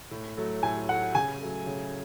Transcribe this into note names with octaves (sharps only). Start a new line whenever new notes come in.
A2
F#3 A3
A2 G#5
F#3 A3 F#5
C#3 G#5
F#3 A3
C#3